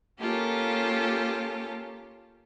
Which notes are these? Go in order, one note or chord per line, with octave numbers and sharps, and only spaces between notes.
A#3 C#4 F4 G4 A4